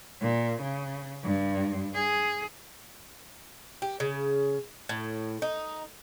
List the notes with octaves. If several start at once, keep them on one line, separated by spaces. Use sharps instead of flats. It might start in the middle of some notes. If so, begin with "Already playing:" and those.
A#2
C#3
G2
G#4
G4
C#3
A2
D#4